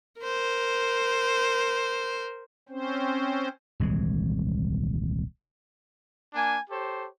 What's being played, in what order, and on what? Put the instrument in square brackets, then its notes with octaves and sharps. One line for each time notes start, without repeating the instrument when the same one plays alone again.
[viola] A#4 C5
[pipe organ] C4 C#4 C5
[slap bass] D#1 C2 E3 G#3
[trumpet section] A#3 D4 G#5
G4 A4 C5 C#5